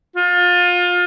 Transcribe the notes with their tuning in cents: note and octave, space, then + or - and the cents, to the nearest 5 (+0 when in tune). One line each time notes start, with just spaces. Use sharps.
F4 +25